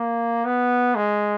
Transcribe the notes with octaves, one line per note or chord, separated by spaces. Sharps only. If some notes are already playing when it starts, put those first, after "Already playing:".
Already playing: A#3
B3
G#3